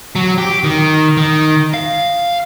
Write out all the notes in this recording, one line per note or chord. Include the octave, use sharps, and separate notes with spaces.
F#3
G4
D#3
D#3
F5